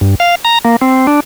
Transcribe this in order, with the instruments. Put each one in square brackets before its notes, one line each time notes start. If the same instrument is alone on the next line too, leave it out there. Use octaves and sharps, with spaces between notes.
[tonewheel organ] G2
F5
A#5
A#3
C4
D4